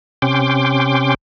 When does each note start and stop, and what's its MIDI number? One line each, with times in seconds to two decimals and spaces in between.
0.22 1.14 48
0.22 1.14 61
0.22 1.14 79
0.22 1.14 84
0.22 1.14 86